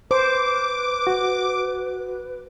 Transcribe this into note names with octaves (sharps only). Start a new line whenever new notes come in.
B4 C5 D6
F#4